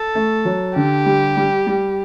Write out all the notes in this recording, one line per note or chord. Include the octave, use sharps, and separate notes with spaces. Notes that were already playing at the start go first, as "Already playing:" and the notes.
Already playing: A4
A3
F#3
D3 G4
G3
G3
G3